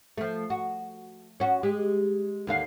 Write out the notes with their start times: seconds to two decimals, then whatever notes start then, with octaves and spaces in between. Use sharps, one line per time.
0.18 F3 A3
0.50 F#4
1.40 C#4 F#4
1.63 G#3 G4
2.47 D#2 D3 F5